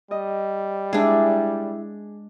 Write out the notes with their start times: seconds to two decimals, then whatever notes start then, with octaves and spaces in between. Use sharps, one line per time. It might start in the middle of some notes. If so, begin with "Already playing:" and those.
0.11 G3 D#5
0.93 G#3 D4 E4 G#4 E5